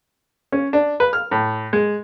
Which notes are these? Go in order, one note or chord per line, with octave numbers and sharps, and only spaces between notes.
C#4
D4
B4
F6
A2
G#3